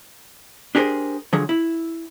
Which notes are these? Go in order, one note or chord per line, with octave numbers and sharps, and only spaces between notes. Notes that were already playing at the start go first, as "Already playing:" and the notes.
D4 G4 G#4 A#4 C5
D3 F3 F#3 G#4
E4